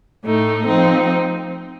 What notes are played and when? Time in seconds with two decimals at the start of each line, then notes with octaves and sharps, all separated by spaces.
0.24 A2 A3 D#4
0.67 F3 C4 D#4